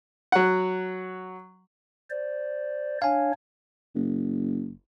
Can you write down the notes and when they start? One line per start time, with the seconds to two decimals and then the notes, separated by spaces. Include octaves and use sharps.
0.32 F#3 F#5
2.10 C5 D5
3.02 D4 C#5 F5 G#5
3.95 F#1